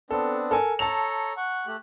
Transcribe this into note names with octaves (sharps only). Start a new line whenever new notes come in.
B3 C4 D4 A4
A4 A#4 G#5
A4 C#5 A5 A#5 F7
F#5 C#6
A3 G4 F#6